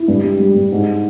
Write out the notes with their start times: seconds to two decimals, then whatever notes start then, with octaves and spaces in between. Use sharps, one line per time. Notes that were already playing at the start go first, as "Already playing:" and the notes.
Already playing: E4
0.08 G2
0.24 G3
0.39 G3
0.55 G2
0.72 G#2